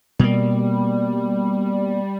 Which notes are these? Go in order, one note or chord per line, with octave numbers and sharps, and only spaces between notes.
B2 G3 A#3